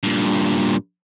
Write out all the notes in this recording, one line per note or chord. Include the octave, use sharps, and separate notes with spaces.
G2 A#2